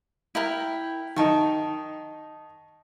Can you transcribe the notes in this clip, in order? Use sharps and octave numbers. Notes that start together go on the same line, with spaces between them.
E4 A#4 G5
D#3 D#4 G5 A5 C#6